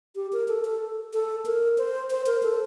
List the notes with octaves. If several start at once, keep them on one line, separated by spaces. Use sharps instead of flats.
G4
A#4
A4
A4
A4
A#4
C5
C5
A#4
A4